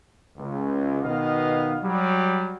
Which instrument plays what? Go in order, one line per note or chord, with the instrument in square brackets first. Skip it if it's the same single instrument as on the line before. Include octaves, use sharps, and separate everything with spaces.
[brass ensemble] C#2
B2 D#3 B3 D#5 F5
F#3 G3